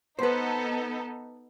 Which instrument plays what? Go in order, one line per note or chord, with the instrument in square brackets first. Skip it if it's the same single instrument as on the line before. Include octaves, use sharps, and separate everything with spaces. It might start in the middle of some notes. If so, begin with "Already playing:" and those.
[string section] B3 D#4 A4 [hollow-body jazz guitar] B4 C5